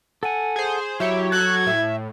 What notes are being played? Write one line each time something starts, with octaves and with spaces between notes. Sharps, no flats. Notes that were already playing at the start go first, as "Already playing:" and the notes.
A4 F#5 G#5
G#4 C5
F#3 E4 G4 C#5 E5
F#4 A4 F#6 G#6
A2 E5